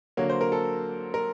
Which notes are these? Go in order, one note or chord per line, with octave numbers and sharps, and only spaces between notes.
D3 F#3 A#3 C#5
C5
A#4
A4
A#4